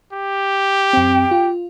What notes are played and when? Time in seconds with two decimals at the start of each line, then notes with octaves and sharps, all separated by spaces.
0.13 G4
0.93 F#2 C4 G5
1.31 F4